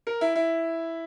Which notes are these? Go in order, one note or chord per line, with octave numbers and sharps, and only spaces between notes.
A#4
E4
E4